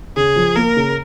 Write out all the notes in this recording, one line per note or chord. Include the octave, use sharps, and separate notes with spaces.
C#3 G#4
F3
A#3 A#4
C#3